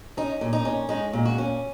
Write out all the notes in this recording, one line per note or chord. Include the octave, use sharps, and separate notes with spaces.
C#4 D#4
A#2
D#4
C#4
G#3 D#4
A#2
F#4
C#4